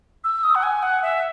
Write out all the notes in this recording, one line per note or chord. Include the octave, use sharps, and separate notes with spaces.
E6
D#6
F#5
G#5
F#5
E5